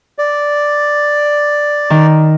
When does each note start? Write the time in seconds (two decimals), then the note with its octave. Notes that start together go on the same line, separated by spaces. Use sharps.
0.18 D5
1.90 D#3